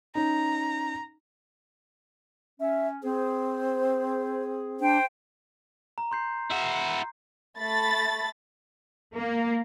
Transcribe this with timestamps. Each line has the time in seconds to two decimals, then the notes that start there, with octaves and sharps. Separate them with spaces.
0.15 C#4 D#4 A#5
2.60 C#4 E5
3.04 C4 G#4 C5
4.80 D4 C5 G5
5.98 A#5
6.11 C6 G6 C7
6.51 E4 F#4
7.59 A3 B5 A6
9.15 A#3